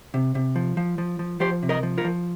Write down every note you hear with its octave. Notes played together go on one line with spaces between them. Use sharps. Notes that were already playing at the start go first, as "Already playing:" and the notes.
C3
C3
F3
F3
F3
F3
F3 G4 C5
C3
A#4 D#5
F3
F4 A#4
F3